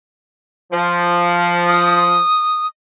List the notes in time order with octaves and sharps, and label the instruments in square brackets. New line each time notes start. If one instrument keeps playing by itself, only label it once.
[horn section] F3
[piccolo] D#6